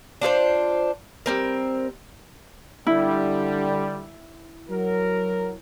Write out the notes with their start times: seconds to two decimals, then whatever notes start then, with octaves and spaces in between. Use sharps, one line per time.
0.21 D4 F4 G#4 C5
1.26 G3 C4 A#4
2.87 D3 G3 E4
4.70 F#3 A#4